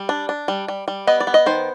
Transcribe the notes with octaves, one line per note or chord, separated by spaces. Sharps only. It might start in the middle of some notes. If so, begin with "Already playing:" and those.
Already playing: G3
D4
D4
G3
G3
G3
B3 D#5
D5
B3
D#5
D#3 C5